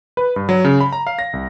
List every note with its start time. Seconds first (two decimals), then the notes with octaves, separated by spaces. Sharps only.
0.17 B4
0.36 G2
0.49 F#3
0.64 C#3
0.80 B5
0.93 A#5
1.07 F5
1.19 A#6
1.33 C2